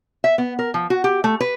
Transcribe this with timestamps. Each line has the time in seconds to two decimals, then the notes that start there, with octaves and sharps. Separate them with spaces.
0.24 E5
0.38 B3
0.59 A#4
0.74 F3
0.90 F#4
1.04 G4
1.24 A3
1.40 B4